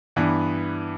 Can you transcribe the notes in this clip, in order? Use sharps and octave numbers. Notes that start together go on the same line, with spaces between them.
G2 E3 B3 D4